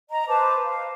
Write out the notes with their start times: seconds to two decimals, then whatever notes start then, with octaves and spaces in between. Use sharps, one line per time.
0.09 D#5 A#5
0.28 B4 C5 A5 D6
0.65 F5